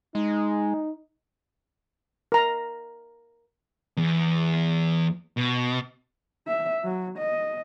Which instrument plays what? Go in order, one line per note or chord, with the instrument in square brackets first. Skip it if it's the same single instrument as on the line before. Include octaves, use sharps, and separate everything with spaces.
[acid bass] G#3 [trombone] D#4
[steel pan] A#4 A#5
[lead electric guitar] E2
B2
[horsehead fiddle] E5
F#3
D#5